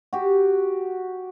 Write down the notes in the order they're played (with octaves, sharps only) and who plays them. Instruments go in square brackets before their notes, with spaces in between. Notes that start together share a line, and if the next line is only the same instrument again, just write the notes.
[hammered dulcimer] F#4 G4